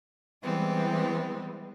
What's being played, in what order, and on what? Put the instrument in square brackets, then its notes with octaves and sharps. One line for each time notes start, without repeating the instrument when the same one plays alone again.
[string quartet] E3 G3 G#3 B3 C4